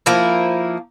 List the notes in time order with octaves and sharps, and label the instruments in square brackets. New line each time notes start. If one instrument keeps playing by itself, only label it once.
[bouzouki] F3 A#3 E4